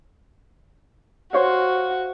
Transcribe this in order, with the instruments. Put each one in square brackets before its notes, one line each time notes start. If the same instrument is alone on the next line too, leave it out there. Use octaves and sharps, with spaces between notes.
[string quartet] F#4 [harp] C5 C#5 F5